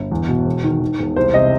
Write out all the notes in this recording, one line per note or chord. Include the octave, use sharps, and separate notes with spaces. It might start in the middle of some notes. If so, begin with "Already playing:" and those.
Already playing: G1
E2
B2
E1
D#3
D#3
E1
C2 C5
C3 D#5